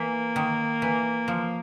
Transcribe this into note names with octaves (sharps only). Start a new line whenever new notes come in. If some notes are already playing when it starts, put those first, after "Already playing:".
Already playing: E3 A#3
D#3
E3
F3